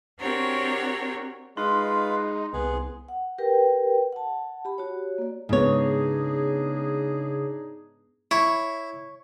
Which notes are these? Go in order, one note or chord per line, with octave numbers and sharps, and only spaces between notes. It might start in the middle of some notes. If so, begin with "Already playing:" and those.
C4 D4 F#4 G4 A#4 C#5
G#3 D#4 F4 B4 F5 C6
C2 B3 G#4
F#5
G4 A#4 B4 G5
F#5 A5
G4 B5
F#4 G4 C#5
A#3 D5
G#2 C#3 B3 D4 D#4 G#4 C#5
E4 C#5